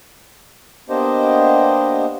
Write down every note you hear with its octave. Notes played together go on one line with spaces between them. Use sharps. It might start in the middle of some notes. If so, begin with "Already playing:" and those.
A#3 B3 D4 G4 C5 D#5